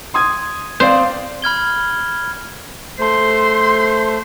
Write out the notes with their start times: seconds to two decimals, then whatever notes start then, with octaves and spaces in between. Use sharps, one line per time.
0.14 C6 D#6 G#6
0.80 C4 C5 D5 F5
1.42 B5 F6 G#6 G7
2.99 A3 C5 C6